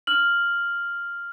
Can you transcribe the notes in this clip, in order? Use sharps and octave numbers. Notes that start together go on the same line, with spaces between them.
F6 F#7